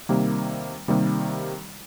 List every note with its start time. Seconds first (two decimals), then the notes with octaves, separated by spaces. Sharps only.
0.09 C3 D#3 G3 A#3
0.88 C3 D#3 G3 A#3